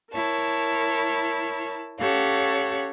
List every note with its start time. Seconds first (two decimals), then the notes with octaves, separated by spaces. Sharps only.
0.12 E4 A#4 C#5 A5
1.99 C#4 G4 A4 C#5 F5 F#5